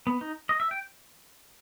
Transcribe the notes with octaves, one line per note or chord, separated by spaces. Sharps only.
B3
D#4
D#5
E5
G5